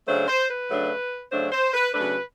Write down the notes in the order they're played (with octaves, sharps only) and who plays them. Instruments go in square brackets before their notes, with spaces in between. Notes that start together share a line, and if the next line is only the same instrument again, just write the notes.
[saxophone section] C#3 F#3 A3 D4 C5
C5
B4
C#3 F#3 A3 D4
C#3 F#3 A3 D4 C5
C5
B4
C#3 F#3 A3 D4 B4